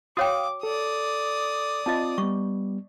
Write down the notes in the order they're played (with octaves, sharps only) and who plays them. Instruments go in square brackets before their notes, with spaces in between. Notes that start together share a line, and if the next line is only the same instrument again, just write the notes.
[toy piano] F#4 C#5 G5 [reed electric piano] F5 D#6 [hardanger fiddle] D6
[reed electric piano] A4 [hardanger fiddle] D5 D#6
[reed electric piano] C4 F4 [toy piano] D#5 A5
[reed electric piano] G3 B3 [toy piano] C#6